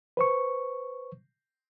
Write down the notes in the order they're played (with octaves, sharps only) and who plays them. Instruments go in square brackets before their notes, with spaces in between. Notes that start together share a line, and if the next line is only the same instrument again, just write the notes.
[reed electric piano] B4 C5 C#6